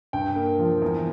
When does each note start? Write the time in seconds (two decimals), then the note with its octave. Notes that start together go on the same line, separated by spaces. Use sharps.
0.13 G2 G5
0.36 A#3
0.59 F3
0.82 E2